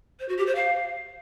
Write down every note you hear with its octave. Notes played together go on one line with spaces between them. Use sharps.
C5
F#4
G4
C5
F5